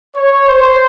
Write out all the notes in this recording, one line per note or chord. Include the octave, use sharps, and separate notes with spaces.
C#5
C5